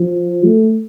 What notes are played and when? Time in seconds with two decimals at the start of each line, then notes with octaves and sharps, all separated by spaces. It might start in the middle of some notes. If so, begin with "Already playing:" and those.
Already playing: F3
0.45 A3